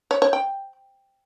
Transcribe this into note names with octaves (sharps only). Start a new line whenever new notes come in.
C#5
C#5
G5